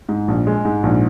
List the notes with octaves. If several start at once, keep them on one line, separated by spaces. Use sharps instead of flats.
G#2
A#1
G#3
G#2
A#1